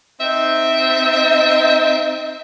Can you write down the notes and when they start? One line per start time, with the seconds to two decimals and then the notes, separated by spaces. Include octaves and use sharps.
0.20 C4 D#4 E5